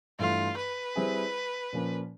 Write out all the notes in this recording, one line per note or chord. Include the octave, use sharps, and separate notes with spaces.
G2 E3 A3 F4
B4
G3 C4 E4 G#4
A#2 F3 A#3 C#4